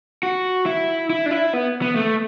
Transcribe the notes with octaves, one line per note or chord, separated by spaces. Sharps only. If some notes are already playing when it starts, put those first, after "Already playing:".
F#4
E4
E4
D4
E4
B3
B3
A3